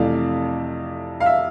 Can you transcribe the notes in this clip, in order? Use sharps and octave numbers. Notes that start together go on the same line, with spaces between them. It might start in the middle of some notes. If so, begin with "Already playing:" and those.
Already playing: F2 C3 E3 A3 D5 F5
F5
E5